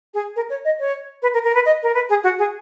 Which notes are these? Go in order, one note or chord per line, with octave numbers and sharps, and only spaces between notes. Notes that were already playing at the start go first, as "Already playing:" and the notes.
G#4
A#4
C#5
D#5
C#5
B4
A#4
A#4
B4
D#5
A#4
B4
G#4
F#4
G#4